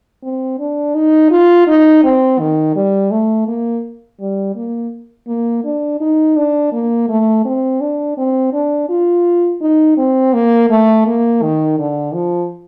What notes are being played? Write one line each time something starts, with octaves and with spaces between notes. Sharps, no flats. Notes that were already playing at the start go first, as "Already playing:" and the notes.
C4
D4
D#4
F4
D#4
C4
D#3
G3
A3
A#3
G3
A#3
A#3
D4
D#4
D4
A#3
A3
C4
D4
C4
D4
F4
D#4
C4
A#3
A3
A#3
D#3
D3
F3